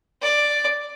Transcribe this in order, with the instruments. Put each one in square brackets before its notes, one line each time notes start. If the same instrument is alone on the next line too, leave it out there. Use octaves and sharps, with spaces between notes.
[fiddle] D5